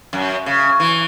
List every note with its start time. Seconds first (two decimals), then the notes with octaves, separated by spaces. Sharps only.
0.13 F#2
0.46 C#3
0.80 E3